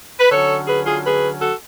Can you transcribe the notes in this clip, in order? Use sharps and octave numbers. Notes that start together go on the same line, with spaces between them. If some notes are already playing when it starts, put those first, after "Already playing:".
B4
D3 F#3 C#4 A4 C#5
G#4 B4
F4 G#4
G#4 B4
F#4 A4